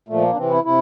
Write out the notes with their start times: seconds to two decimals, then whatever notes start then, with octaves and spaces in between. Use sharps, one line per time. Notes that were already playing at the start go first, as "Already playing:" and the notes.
0.08 A#2 F3 A3
0.22 A#3
0.33 D4
0.37 C3 E3 C4
0.51 E4
0.64 C3 E4